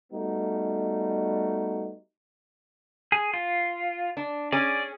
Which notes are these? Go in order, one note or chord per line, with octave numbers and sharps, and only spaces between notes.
G3 A3 B3 D#4 F#4
G#4
F4
D4
C#4 G#4 D5